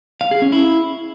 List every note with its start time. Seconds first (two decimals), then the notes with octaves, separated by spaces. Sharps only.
0.21 F5
0.31 G#4
0.42 C#4
0.52 E4